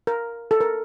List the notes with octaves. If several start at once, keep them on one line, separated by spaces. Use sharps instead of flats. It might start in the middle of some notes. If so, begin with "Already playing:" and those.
A#4
A4
A#4